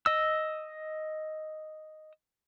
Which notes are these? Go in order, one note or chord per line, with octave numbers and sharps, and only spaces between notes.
D#5 E6